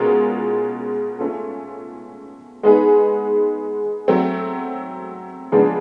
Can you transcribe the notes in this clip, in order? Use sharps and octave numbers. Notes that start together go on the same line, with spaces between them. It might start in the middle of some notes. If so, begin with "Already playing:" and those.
Already playing: B2 G#3 C#4 F4 A#4
A3 C#4 F4 A4
G#3 B3 D#4 G#4 B4
F#3 A3 C4
C#3 F3 G#3 B3 D4